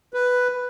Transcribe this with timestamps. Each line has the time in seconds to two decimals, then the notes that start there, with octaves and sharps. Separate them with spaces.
0.14 B4